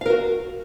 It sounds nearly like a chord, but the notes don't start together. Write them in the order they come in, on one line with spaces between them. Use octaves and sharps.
F5 A#4 F#4